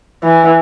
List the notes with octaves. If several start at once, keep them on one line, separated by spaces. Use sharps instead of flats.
E3